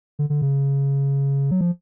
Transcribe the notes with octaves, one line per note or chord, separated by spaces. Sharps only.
D3
D3
C#3
F#3
F3